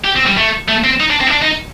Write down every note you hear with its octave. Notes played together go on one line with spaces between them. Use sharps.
G4
C4
G3
A3
A3
C4
D#4
D4
C4
D#4
D4
D#4